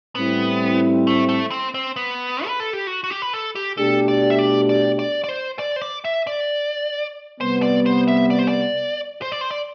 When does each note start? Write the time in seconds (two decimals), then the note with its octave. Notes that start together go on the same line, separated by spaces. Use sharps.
0.15 A2 G3 B3 C4 E4
1.07 A3
1.29 A3
1.51 C4
1.74 C4
1.96 B3
2.46 B4
2.60 A4
2.73 G4
2.87 F#4
3.04 F#4
3.10 G4
3.22 B4
3.33 A4
3.55 G4
3.77 B2 A3 D4 G4 A4
4.08 D5
4.30 E5
4.39 D5
4.69 D5
4.99 D5
5.24 D5
5.29 C5
5.59 D5
5.76 C5
5.82 D5
6.04 E5
6.27 D5
7.40 C3 G3 B3 C5
7.62 D5
7.86 C5
8.08 E5
8.30 D5
8.39 C5
8.48 D5
9.22 C5
9.32 D5
9.41 C5
9.51 D5